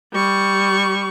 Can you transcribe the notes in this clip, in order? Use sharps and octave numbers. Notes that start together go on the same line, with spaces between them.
G3 C#6